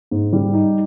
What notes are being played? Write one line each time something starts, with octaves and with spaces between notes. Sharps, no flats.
G#2
G3
D#4